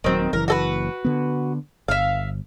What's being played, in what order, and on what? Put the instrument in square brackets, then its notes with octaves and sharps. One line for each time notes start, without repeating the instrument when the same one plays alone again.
[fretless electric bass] D#1 F#3 [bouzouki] D#3 C4
[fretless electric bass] F#1 E3 [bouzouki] A#4
[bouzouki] F#4 A4 B4
[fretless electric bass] D3 B3
[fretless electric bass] G1 [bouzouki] E5 F5